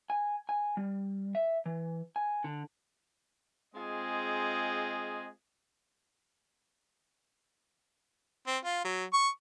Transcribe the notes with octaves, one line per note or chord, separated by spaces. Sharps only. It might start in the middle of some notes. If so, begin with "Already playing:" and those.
G#5
G#5
G3
E5
E3
G#5
D3
G#3 C4 F4 G#4 D#5
C4
F4
F#3
C#6